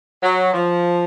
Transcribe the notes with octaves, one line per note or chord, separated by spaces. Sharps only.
F#3
F3